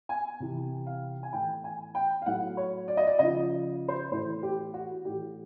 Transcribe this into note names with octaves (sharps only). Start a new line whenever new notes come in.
G#5
C3 E3
F5
G#5
A2 E3 G5
G#5
G5
F5
A2 F#3 F#5
C#5
D5
D#5
D5
C#3 F3 D#5
C5
A2 E3 C5
G4
F#4
A2 E3 G4